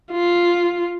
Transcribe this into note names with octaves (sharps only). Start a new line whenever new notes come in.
F4